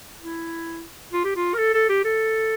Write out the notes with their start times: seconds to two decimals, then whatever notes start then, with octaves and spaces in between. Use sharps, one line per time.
0.20 E4
1.12 F4
1.24 G4
1.36 F4
1.54 A#4
1.58 A4
1.74 A4
1.89 G4
2.05 A4